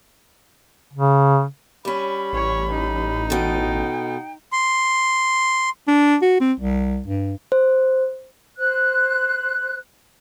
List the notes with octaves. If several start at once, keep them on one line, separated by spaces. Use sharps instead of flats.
C#3
G3 C#4 B5
A1 C#5
D#4
B2 A4 G5
C6
D4
F#4
C4
C2
G2
C5
C5 F#6